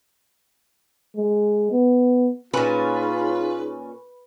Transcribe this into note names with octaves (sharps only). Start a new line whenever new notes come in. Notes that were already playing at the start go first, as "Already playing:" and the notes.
G#3
B3
A#2 C#4 D#4 F4 G#4 B4